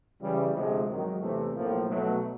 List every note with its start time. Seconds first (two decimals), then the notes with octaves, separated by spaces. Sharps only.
0.19 C#3 E3 G3
0.52 D2 C3 F3 G#3
0.86 G#1 G#2 D#3 F#3
1.19 E2 C3 E3 A3
1.53 B1 A2 F3 A#3
1.86 B1 B2 F#3 A3